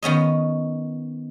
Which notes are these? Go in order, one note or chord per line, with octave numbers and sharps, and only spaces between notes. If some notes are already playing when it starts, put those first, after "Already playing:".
D#3 B3 C#4 D#5